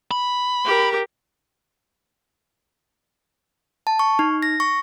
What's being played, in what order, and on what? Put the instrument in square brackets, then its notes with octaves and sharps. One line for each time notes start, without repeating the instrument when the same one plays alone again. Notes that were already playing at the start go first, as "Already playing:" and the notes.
[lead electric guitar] B5
[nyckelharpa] G4 A#4
[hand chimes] A5
C#6
D#4
A#6
C#6